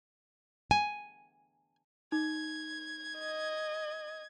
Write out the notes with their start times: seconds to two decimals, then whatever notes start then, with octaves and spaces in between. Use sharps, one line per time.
0.71 G#5
2.12 D#4 G#6
3.18 D#5